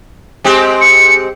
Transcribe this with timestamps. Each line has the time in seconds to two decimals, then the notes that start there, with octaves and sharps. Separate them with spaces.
0.44 G#3 C4 G4
0.81 C#7